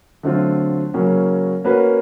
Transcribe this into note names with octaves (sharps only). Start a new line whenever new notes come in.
D3 F#3 A3 C4 F4
C#3 F#3 A#3 C#4
A#3 C#4 F#4 B4